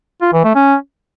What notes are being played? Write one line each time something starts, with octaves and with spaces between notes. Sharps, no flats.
F4
E3
A3
C#4